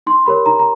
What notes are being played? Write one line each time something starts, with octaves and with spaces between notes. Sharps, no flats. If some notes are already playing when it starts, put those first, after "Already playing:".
D#4 C6
G4 A#4 C#5 B5
D#4 A#5
A#5